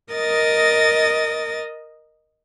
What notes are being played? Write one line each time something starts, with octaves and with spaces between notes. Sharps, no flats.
A#4 D#5 D#6 A6